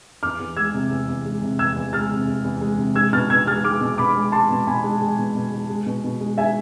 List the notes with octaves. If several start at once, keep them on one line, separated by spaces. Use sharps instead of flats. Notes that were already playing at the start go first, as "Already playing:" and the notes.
E2 D6 F6
E2
G#3 E6 G#6
C3
E2
E2
G#3
C3
E2 E6 G#6
E2
G#3 F6 A6
C3
E2
E2
G#3
C3
G#3 E6 G#6
B2 F6 A6
B2 E6 G#6
G#3 F6 A6
G#3 D6 F6
B2
B2 B5 D6
G#3
G#3 A5 C6
B2
B2 G#5 B5
G#3
G#3
B2
B2
G#3
G#3
B2
B2
G#3
G#3 E5 G#5